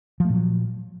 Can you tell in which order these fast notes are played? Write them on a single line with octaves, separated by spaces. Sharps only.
F3 A3 A#2 F#3